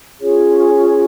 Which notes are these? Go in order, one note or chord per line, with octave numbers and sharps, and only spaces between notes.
C#4 F4 G#4 C#5